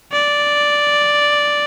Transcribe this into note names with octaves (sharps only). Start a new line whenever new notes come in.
D5